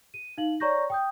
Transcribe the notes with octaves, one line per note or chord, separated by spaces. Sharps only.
D#7
D#4 F5 F#7
C#5 D5 A#5 C#6 G6 A#6
G5 D#6 G6